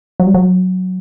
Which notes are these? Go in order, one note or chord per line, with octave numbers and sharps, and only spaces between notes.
F#3
G3
F#3